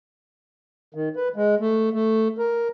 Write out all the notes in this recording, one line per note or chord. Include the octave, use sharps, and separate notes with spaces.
D#3
B4
G#3
A3
A3
A#4